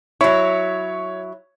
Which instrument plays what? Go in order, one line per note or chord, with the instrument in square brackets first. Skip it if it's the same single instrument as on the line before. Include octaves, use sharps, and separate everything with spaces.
[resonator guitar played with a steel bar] F#3 E4 [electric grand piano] C#5 C#6